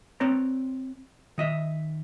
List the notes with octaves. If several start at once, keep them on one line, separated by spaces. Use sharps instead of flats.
C4 B4 C#5 D5 A#5
D#3 D#5 E5